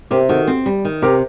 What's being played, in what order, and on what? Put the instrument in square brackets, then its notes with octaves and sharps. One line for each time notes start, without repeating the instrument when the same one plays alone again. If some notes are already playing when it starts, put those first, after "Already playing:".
[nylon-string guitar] C3 [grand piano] G4 A#4
[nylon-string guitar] D#3 [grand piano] F#4 A4
[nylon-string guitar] C4
G3
D#3
[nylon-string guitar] C3 [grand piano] G4 A#4